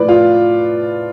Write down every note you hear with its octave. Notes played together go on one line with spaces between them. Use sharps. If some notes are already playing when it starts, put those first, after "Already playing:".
Already playing: A2 F3 B4 D5
F4